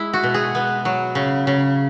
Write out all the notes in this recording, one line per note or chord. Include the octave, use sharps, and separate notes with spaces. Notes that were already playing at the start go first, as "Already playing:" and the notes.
Already playing: G#3 E4
F#4
B2
G#4
B3
F#3
C#3
C#3